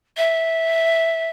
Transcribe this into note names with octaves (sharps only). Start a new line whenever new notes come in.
E5